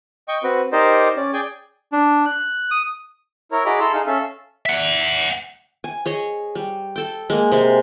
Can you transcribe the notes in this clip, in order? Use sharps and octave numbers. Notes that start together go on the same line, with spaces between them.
D#5 G5 C#6
C4 F#4 B4
D#4 G4 A#4 C5 D5 D#5
C#4 D5
G#4 D5 G5 G#5
D4
F#6
D#6
E4 A#4 C#5 A#5
F#4 G#4 D#5 A#5 B5 D6
E4 A4 A#5 C6 E6
D#4 G#4 F5
C#4 A4 E5 F5
E5 F#5
G#5
G#4 C#5 D#5
G3
A4 G5
G#3 A#3
C3 G#3